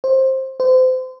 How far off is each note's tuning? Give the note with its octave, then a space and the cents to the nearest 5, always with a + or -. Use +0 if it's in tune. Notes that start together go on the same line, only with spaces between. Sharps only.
C5 +15
C5 -30